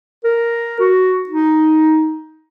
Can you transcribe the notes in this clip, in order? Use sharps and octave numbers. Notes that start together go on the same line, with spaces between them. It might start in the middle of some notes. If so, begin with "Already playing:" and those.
A#4
F#4
D#4